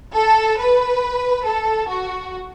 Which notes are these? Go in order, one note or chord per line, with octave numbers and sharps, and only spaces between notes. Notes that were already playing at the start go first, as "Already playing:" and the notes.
A4
B4
A4
F#4